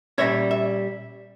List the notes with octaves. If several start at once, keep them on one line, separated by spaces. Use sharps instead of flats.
A#2 G3 C#4 C#5 E5
E5